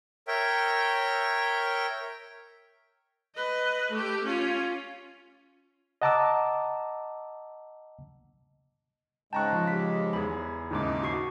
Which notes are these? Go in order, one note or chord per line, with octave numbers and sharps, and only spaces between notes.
A#4 C#5 E5 G5
B4 D#5
A3 G4
C#4 F4
D#5 F#5 A5 A#5 D6 E6
G#2 C#3 G#3 G5 A5 A#5 C#6 F#6
F3
G4 B6
E2 G#4 B5
D#2 G#2 C#3 D#4 E4 D6
F#4 C#6 C7